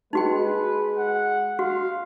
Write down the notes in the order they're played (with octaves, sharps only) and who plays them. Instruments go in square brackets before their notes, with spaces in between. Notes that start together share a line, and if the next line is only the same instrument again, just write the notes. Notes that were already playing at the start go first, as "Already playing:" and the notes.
[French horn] G#3 [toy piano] D#4 F#4 G5 [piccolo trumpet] B4
[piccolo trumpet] F#5
[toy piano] F#4 [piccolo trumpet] F5